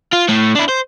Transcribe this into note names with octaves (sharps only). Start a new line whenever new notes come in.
F4
A2 A3
D4 E4
C5